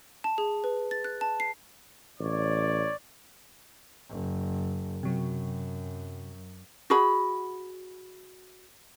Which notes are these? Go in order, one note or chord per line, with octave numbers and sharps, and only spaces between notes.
A5
G#4
B4
A6
F#6
A5
C7
A1 C#5 D5
F#1
F#2 C3 F#3
F#4 G#4 B5